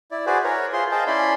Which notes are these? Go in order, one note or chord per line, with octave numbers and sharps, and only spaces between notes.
E4 D5
F#4 G#4 B4 C5 D5
A#4 B4 C#5
F4 G#4 C5 C6
G#4 C5 D#5 F5 G5 A5
C#4 E4 D5 B5 C6